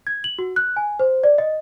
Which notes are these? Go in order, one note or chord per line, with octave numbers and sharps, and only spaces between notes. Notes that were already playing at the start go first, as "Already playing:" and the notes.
G#6
F#7
F#4
F#6
G#5
C5
D5
D#5